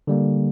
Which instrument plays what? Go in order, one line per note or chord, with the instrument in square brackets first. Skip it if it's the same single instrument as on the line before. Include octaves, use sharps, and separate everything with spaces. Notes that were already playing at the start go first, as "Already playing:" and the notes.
[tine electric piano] D3 G3 A#3